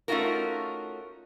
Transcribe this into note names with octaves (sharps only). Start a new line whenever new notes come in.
A3 C#4 D#4 F4 F#4 A#4